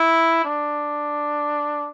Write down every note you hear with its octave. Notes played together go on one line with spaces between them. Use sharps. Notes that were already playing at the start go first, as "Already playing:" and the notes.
Already playing: E4
D4